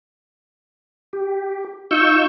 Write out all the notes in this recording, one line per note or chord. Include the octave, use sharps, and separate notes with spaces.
G4
D#4 F4 C#6 E6 G6